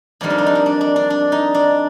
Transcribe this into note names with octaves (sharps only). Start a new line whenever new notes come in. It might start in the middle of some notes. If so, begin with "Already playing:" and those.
F2 D#3 G3 D4
D#4
D4
D#4
D4
D4
D4
D4
D4
D#4
D4